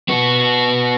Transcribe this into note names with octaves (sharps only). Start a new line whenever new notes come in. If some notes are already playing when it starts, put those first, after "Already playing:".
B3 F#4